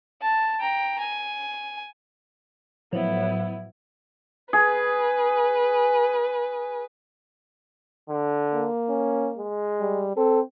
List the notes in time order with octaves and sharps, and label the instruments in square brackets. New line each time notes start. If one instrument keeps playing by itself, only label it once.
[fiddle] A5
G5 A#5
G#5
[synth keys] A2 F3 F#3 [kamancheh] B3 E4
[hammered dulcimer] G#4 [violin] B4
[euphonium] D3
[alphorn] A#3
[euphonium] C#4
G#3
[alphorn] G3
[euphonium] C4 [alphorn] A4